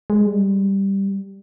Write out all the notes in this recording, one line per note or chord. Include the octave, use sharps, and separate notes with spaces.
G#3
G3